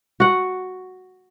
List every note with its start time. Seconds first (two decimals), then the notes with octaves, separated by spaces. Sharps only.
0.20 F#4 F#5